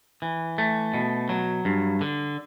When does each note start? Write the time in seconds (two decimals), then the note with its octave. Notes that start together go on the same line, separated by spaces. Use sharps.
0.22 E3
0.58 A3
0.94 B2
1.29 F#3
1.65 G2
2.01 D3